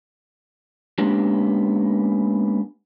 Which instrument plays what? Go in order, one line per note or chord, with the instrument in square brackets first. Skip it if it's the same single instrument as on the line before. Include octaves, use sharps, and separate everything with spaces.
[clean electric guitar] G#3 A#3 B3 C#4 D4 G4